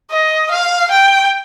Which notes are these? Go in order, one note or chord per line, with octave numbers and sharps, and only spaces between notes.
D#5
F5
G5